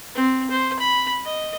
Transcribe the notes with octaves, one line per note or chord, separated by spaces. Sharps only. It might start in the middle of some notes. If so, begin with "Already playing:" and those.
C4
C5
B5
D#5